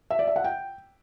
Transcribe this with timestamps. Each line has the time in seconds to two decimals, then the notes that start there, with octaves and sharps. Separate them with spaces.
0.10 E5
0.19 D5
0.27 E5
0.36 F#5
0.44 G5